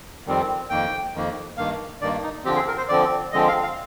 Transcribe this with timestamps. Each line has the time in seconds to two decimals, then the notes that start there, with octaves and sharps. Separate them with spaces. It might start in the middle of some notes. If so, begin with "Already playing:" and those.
0.26 F2 D#3 G3 C4
0.70 F2 D#3 A#3 G5
1.14 F2 D#3 A#3
1.57 G2 D#3 A#3 F5
2.01 G2 D#3 A#3 D5
2.23 D#4
2.45 D3 F3 C4 G4
2.56 G#4
2.68 A#4
2.77 C5
2.89 D3 F3 C4 D5
3.32 D3 F3 G#3 C4 D#5
3.48 F5
3.63 F5